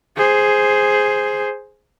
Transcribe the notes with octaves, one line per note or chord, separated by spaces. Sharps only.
G#4 C5